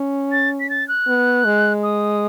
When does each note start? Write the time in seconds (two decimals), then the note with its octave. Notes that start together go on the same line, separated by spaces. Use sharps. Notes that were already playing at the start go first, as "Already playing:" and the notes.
Already playing: C#4
0.32 A6
0.60 B6
0.70 A6
0.88 F#6
1.08 B3
1.45 G#3
1.83 D#6